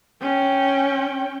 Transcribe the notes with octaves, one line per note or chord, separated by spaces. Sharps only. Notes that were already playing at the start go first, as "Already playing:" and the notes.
C#4 G5